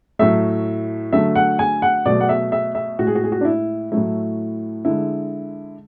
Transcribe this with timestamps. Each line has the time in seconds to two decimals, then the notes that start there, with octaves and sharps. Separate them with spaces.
0.19 A2 F#3 A3 E5
1.13 D3 F#3 A3 E5
1.35 F#5
1.59 G#5
1.82 F#5
2.06 B2 F#3 A3 D5
2.21 F#5
2.29 E5
2.52 E5
2.75 E5
2.99 A2 G#3 F#4
3.07 G#4
3.15 F#4
3.24 G#4
3.32 F#4
3.41 D4
3.45 E4
3.92 A2 F#3 A3 E4
4.85 D3 G#3 E4